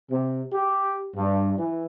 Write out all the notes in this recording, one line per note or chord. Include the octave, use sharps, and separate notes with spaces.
C3
G4
G2
E3